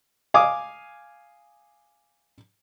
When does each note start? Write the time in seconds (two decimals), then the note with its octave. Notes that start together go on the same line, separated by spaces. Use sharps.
0.34 F5 G#5 D6 D#6